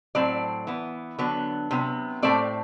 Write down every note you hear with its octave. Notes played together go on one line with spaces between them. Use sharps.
A2 F#3 A3 C4 D5
E3 B3
D3 F#3 B3
C3 F#3 B3
A2 F#3 A3 C4 D5